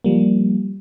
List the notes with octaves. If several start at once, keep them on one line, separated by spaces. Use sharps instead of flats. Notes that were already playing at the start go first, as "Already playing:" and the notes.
F3 G3 A#3